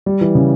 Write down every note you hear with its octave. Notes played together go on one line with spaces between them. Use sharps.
G3
E3
C#3